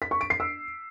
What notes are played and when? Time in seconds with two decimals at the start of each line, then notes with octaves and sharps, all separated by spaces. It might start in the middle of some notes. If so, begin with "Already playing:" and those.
0.02 B6
0.11 C#6
0.21 D7
0.30 C7
0.40 E6